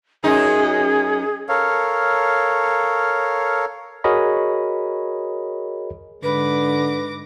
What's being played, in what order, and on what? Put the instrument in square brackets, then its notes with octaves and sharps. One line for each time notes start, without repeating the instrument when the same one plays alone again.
[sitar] F#2 D#4 [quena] G#4
[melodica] A4 A#4 C#5 F5
[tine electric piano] F#4 G#4 A#4 C#5 D#5 B5
[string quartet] G#2 D6 A#6 [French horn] D3 [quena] B4